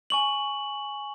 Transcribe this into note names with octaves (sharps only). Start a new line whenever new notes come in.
G#5 C#6 F#7